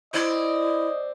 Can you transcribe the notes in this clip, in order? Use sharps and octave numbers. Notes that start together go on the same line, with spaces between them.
C4 E4 D5 D#5